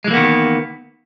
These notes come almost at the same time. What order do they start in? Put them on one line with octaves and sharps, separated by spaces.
G#3 E3 A#3 B3 D#3